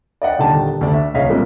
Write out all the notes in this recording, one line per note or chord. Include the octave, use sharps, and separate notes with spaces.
D5 D#5 F#5 G5
D#1 D3 D#3 D4 G4 A5
D2 D4
E5
D#1 C#2 C#5 D#5 F5 B6
C3 F3 G3 G#3 A#3